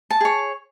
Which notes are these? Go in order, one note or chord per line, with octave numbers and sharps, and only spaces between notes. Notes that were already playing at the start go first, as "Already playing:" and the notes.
A5
G#4 C#5